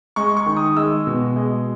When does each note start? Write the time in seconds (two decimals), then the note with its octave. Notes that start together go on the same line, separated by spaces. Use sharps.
0.16 G#3 C#6
0.37 C#6
0.46 D#3
0.57 D#6
0.77 G#3 E6
1.07 B2
1.36 G#3